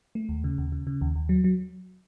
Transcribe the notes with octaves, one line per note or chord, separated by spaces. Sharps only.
A3
D#2
C#3
D#2
C#3
C#3
D#2
D#2
F#3
F#3